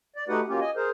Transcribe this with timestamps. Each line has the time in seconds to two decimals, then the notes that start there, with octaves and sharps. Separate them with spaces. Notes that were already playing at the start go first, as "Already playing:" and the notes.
0.16 D5
0.28 A3 D#4 F#4 G4 B4 F#5
0.48 F#3 A#3 C#4 F4 G4
0.60 D#5 G#5
0.76 G#4 A#4 C5